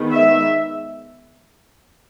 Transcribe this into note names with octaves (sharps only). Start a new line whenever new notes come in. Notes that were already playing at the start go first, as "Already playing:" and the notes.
Already playing: D#3 G#3 B3
E5